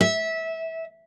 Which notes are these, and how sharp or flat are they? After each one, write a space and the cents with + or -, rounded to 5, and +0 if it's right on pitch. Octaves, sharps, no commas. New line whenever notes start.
E5 -20